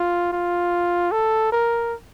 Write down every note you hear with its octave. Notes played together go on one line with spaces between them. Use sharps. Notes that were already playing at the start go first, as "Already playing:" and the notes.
Already playing: F4
F4
A4
A#4